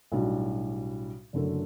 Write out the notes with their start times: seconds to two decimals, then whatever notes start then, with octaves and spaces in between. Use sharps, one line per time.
0.12 B1 A2 G3 D4 F#4
1.33 F#1 F#2 D3 A3